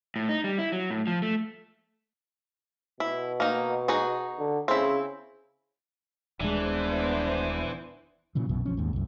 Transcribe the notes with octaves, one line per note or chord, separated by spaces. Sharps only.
A2
D#4
G3
E4
F#3
A2
F3
A3
B2 E4
A#3 D#4
D#4 F#4 G#4
D3
C#3 C4 E4
D#1 E3 G#3 B3 D4 C5
A#2 C#3 E3 F#3
B1 F#2 B2
A#1 F3 C#4
D#2 G#2
C2 F#2